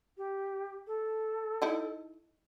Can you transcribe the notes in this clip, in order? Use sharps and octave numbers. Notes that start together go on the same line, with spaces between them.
G4
A4
D#4 E4 D#5